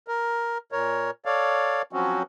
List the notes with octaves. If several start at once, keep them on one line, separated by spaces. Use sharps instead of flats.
A#4
A#2 A#4 C#5
A4 C#5 D5 F5
F3 F#3 C4 C#4 F#4